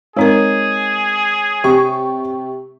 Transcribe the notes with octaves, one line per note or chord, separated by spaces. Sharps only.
G#3 C4 D#4 G#4 A#4 C#5
C3 G4 C#6